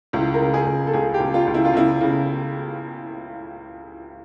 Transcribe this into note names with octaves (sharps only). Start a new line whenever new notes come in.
C#2 E4
A#4
C#3
G#4
C#2
A4
C#2 G#4
G4
C#2
F4
C#2
E4
F4
C#3 E4
C#3